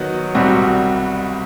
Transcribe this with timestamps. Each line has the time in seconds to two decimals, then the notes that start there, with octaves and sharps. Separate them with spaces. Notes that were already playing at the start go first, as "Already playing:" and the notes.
Already playing: D#3 F#3 B3 F#4
0.35 C2 B2 G3 C4 F#4